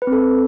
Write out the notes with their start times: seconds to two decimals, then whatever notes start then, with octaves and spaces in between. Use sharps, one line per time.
0.02 B4
0.07 C4
0.13 A4